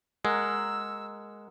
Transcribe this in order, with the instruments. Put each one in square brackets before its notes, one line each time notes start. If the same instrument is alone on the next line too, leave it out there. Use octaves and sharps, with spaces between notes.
[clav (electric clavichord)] G#3 [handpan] A#4 F#5 [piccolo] E6